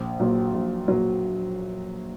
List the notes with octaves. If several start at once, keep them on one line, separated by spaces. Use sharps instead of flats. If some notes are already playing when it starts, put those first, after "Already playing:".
Already playing: A#1
A#2 F#3
A#1
A#2 F#3